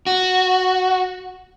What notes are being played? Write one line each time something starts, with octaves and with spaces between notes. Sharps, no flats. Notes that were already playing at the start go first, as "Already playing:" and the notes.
F#4